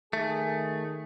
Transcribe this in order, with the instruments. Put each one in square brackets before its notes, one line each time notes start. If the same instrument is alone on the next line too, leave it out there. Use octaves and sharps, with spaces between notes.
[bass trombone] D#3 [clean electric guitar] A3 [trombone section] G#4